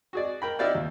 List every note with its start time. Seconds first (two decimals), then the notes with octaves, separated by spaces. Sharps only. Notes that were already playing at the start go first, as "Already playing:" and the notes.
0.13 F#4 G#4 D5
0.42 A#4 G5 B5
0.59 D#4 E4 G4 D5 F5 G5
0.75 D#2